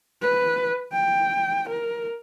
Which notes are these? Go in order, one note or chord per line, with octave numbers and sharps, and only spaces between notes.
B4
G5
A#4